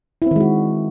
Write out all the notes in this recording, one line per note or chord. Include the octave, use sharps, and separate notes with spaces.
D#3 G#3 C4 E4 F#4